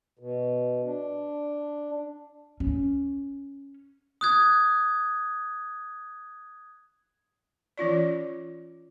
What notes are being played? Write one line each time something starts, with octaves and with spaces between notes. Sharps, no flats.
B2
D4
C#4
D#6 F#6 G#6
E3 C#4 F4 D5